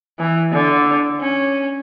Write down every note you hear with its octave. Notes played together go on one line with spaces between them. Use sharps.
E3
D3
C#4